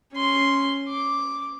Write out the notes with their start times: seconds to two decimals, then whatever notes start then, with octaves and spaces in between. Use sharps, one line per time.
0.13 C#4 C6
0.89 D6